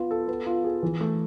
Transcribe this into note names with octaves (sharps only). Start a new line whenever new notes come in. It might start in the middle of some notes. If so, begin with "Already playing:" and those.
Already playing: B3 F4
A4
B3
F4
G#4
E3
A3